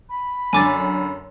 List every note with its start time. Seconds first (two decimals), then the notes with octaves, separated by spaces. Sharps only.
0.09 B5
0.53 F#2 D3 G#5 D6 A6